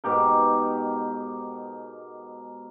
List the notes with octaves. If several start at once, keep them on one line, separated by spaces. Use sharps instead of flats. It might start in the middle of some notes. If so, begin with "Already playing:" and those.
G#2 B2 G4 A#4